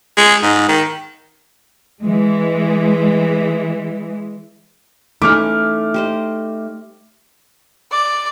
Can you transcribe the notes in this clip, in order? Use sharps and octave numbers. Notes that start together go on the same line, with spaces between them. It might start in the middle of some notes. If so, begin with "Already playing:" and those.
G#3
G#2
D#3
E3 G#3
E3 A3 C#4 D#4 D6 F6
G4 C5 D#5
D5